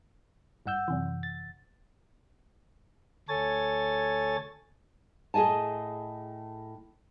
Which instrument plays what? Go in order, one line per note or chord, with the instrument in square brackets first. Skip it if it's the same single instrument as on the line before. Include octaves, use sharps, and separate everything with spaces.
[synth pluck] G#1 G2 F#5 E6 G6
F#2 C3 E3
A6
[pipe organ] D2 A4 C#5 G#5 A6
[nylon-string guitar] A2 G#4 D#5 G#5 A5